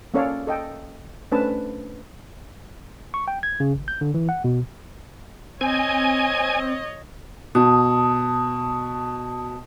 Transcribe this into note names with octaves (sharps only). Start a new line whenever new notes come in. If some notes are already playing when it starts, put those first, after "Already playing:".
A#3 C#4 A4 C#5 D5 F5
A4 D#5 G5
A3 C#4 D4 B4 C5 A5
C#6
G5
G#6
C#3
G#1
G6
D3
E3
F#5
B2
C4 C#5 D#5 G#5
B2 A5 D#6